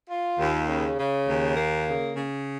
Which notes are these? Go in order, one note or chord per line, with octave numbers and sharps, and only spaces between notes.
F4
D#2
C#3
C#3
D#2
A#3
C#3
C#3